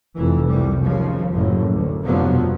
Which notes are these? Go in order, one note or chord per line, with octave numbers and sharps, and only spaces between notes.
F1 E3
C2 G3
D#2 C#3 F3
F#1 A2
D2
F1 G2 B2 F3 F#3 B3